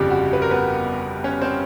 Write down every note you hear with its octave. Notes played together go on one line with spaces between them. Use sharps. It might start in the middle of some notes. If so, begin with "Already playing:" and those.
Already playing: G1 F2 C#3 G3 G4
F#4
B4
A#4
B3 B4
C#4 C#5
C4 C5